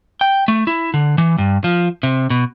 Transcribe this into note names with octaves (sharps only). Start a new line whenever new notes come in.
G5
A3
E4
D3
E3
G2
F3
C3
B2